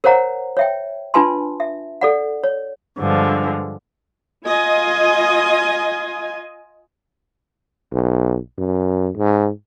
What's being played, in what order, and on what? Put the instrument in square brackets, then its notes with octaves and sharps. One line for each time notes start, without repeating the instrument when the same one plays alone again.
[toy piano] A#4 C5 C#5 F#5 A#5
C#5 E5 G5
D4 F4 B4 G#5 A5 C6
E5
A4 D5 F#5
C#5
[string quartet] G2 D3 F3 G#3
[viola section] F4 D#5 G#5
[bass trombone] B1
F#2
G#2